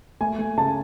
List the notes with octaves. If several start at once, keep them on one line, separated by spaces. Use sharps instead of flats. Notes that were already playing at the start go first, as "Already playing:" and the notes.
A3 G#5
A3
C#3 A5